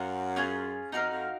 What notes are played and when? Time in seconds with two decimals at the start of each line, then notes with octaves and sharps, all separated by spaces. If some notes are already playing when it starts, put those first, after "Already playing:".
Already playing: F#2 F4 A#4 F#5
0.36 C#4 F4 G#4
0.92 F2 D#4 F#4 A#4 F5
1.11 F2